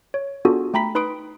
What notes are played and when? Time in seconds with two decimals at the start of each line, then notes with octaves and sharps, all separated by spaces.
0.14 C#5
0.45 B3 D4 F4 F#4 G#4 A4
0.74 A3 G5 A#5 B5 B6
0.95 D#4 B4 B5 C6 D#6 D7